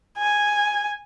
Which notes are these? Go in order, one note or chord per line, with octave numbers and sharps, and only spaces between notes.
G#5